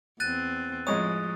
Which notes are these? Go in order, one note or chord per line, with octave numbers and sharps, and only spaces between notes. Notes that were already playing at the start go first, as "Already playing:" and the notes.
E2 C4 F#6 A6 D#7
A1 F3 G#3 C#5 D#6